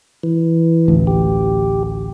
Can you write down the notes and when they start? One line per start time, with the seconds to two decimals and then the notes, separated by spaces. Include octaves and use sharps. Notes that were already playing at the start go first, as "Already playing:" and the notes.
0.23 E3
0.88 A1 D2
1.07 G4